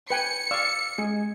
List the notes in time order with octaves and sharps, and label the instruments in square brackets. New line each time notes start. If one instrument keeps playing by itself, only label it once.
[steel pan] B4 G5 G#5 [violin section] C#7
[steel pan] D5 F5 C#6 [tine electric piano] E6
[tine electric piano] G#3 [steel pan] G#4